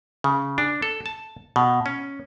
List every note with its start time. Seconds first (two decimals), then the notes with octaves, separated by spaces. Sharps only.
0.24 C#3
0.58 D4
0.82 A4
1.06 A5
1.56 B2
1.86 C#4